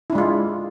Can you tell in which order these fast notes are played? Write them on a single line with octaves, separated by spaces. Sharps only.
E4 D4 G#3 F4